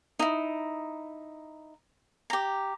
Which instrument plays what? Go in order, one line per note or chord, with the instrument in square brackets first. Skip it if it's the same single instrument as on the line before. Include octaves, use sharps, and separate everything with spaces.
[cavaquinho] D#4 E4
G4 A#5